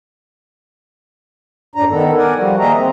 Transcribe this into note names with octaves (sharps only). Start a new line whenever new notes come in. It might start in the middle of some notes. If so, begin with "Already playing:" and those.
F#2 A2 D4 A#5
D#3 B3 A4
A#4 D5 F#5 G#5
F3 G3 F#4
D#3 A#3 G#4 D#5 E5 A#5
C4